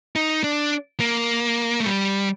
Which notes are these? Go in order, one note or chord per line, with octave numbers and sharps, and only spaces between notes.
D#4
D4
A#3
A3
G3